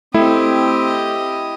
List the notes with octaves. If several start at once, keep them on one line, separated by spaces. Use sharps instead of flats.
A3 C4 E4 G4 D#5